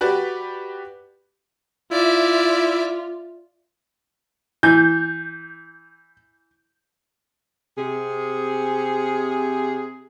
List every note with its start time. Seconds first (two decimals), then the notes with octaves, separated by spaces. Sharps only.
0.01 F#4 G4 B4 D5
1.92 E4 F4 D5 E5
4.63 E3 G6
7.78 C3 G#4